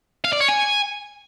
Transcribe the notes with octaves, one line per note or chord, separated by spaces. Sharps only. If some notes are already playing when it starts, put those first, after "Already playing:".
F5
D5
C#5
G#5